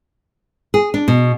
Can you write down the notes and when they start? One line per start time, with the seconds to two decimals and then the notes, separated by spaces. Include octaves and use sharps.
0.74 G#4
0.94 D4
1.08 B2